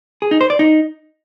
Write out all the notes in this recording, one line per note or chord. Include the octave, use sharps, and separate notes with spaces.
G#4
D#4
C5
D5
D#4